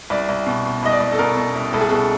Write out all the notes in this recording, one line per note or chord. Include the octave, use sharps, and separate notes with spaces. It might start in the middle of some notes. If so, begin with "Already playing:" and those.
C2 D5
C2
B2
B2
C2 D#5
D5
C2
A4
B2 A#4
B2
C2
C2 A4
G#4
B2 A4